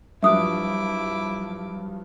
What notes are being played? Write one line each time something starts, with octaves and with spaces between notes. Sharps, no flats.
G2 F3 F#3 E4 E5 D6 D#6 F#6